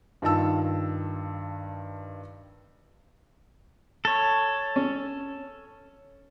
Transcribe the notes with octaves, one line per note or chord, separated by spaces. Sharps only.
G2 D#3 F4 A5 E6
A4 C#5
C#4